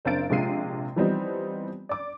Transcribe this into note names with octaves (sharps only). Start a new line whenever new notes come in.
F#1 C4 D4 F5 A6 D7
A#1 C3 G#3 F4 C7 D#7
E3 F3 G3 B3 C4 D#4
D5 D6